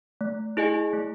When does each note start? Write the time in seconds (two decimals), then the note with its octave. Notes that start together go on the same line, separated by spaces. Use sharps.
0.21 A3
0.57 E4 G#4 D#5 G#5
0.93 A3